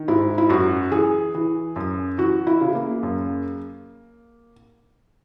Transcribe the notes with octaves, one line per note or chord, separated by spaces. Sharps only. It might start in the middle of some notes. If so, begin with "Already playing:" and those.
Already playing: D#3
G#2 E4
E4
F#2 F#4
E3 G#4
E3
F#2
E3 F#4
E4
C#3
A#3
F#2